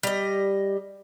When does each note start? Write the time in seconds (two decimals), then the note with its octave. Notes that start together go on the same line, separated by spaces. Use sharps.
0.03 G3 D#5